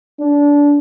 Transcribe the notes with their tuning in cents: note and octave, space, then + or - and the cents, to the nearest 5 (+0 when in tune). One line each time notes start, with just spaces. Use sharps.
D4 -20